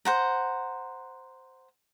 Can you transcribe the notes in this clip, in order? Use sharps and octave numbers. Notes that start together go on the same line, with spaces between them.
C5 F#5 A#5